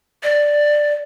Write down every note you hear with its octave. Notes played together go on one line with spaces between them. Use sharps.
D5